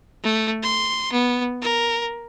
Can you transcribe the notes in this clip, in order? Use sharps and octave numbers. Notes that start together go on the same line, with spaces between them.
A3
C6
B3
A#4